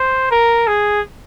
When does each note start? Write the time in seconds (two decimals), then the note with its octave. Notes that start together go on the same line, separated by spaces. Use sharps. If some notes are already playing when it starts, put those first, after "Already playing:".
Already playing: C5
0.31 A#4
0.67 G#4